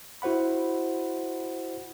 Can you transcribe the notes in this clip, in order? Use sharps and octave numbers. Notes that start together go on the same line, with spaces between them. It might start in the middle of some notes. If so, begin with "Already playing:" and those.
E4 F#4 C5 F#5 B5